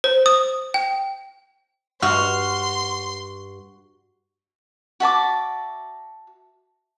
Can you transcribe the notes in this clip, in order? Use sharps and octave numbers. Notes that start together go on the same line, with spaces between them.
C5
D#6
G5
G2 F#4 C6 F6
F#4 E5 A5 D6